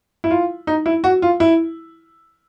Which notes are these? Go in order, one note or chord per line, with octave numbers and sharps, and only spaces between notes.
E4
F4
D#4
E4
F#4
F4
E4